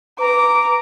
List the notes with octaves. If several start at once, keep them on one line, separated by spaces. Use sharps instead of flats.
B4 A#5 D6